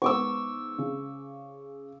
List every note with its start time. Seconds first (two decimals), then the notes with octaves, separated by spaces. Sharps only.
0.02 G#2 B3 C#6 D6 E6
0.78 C#3